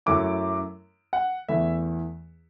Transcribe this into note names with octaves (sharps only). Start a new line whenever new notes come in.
F#2 F#3 A3 E4 D6
F#5
E2 E3 A3 E4 E5